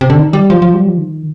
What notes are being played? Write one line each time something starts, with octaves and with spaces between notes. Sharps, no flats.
C3
D3
D#3
G3
F3
F3
G3
F3
D#3